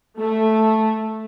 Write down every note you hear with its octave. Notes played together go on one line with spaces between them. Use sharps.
A3